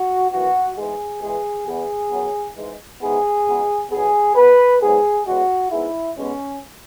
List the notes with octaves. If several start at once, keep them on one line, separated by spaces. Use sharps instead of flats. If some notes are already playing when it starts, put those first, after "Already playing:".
Already playing: F#4
F#2 E3 B3 F#4
G#2 E3 G#3 B3 G#4
E2 E3 G#3 B3 G#4
E2 E3 B3 G#4
F#2 F#3 B3
G#2 E3 G#3
G#2 E3 B3 G#4
C#2 B2 G#3 B3
B1 B2 B3 G#4
E2 B2 B3 B4
G#2 F#3 B3 G#4
E2 C#3 G#3 B3 F#4
G#2 G#3 B3 E4
B1 B2 G#3 B3 C#4